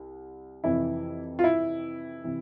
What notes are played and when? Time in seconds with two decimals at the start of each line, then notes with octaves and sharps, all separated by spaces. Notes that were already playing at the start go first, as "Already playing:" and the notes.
Already playing: C2
0.64 F2 C3 E3 E4
1.39 F4
1.44 E4
2.24 C3 E3